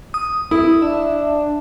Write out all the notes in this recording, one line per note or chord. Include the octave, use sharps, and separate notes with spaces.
D#6
E4 D#6
D4 E5